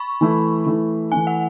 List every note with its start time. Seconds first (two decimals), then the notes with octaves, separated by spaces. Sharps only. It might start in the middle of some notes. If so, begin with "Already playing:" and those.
Already playing: B5 C#6
0.21 E3 A3 E4
0.66 E3 A3 E4
1.12 E3 A3 E4 G#5
1.27 F#5